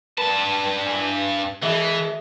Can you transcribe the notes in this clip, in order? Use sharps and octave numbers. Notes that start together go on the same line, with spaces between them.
G2 B4 A5
B4 G#5
E3 G#4 D#5 E5